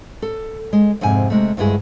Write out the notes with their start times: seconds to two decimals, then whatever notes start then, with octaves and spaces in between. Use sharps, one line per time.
0.22 A4
0.73 G#3
1.01 F2 G#2 C3 G#5
1.30 C3 G#3 A3
1.57 D2 G2 G#3 E4 G#4